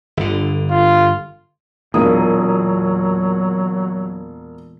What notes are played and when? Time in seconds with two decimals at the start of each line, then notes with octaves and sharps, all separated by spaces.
0.17 G1 D3
0.70 F4
1.94 E1 E2 A#2 F#3 A#3 D#6